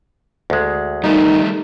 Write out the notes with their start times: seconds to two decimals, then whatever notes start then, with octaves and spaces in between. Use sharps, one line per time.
0.50 D2 G#3
1.04 D#3 G3 A3 D#4